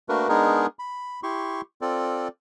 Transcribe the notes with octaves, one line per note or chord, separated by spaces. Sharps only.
A3 A#3 D4 F#4 A#4 B4
G#3 B3 D4 D#4 G#4 A#4
B5
E4 G4 C6 C#6
C4 F4 A4 D5